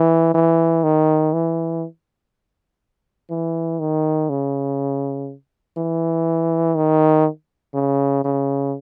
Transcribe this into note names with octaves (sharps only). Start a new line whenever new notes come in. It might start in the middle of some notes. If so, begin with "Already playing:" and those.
Already playing: E3
E3
D#3
E3
E3
D#3
C#3
E3
D#3
C#3
C#3